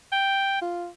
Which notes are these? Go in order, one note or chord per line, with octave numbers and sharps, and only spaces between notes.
G5
F4